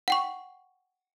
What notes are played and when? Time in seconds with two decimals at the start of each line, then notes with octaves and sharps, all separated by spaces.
0.08 F#5 G5 C#6